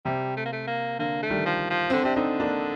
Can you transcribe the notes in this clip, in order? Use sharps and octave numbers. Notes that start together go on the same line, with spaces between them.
C3 G3
A3
A#3
A3
A#3
D3 A#3
A3
D#3 G3
F3
F3
D3 C4
C3 D4
D3 C4 D#4
A#3 D4